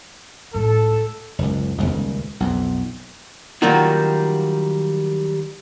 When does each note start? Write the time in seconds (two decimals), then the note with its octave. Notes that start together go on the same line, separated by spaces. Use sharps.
0.54 C#2 A2 A4
1.39 F#1 C#2
1.78 D#1 G#1 C#2
2.40 B1 F2
3.62 D#3 F#3 G3 A#3 F4 F#4